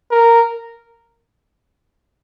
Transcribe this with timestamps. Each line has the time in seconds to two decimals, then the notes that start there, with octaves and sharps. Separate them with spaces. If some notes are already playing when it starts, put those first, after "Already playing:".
0.11 A#4